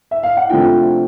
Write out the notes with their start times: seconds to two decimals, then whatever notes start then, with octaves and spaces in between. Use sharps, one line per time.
0.11 E5
0.23 F5
0.37 F#5
0.49 C3 F3 A3 D4 F4 G5